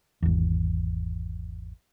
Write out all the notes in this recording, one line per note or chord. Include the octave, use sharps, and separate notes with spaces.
G#1 E2